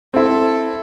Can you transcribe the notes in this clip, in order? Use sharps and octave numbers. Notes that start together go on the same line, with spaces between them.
C4 E4 A4